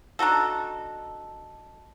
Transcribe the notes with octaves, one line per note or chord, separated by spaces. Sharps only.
D4 D#4 F#4 A4